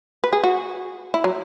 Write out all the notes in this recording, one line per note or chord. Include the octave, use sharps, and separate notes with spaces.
B4
G#4
F#4
E4
F#3